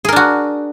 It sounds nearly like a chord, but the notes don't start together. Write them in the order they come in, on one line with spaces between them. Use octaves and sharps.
G#4 A#4 D4 F#4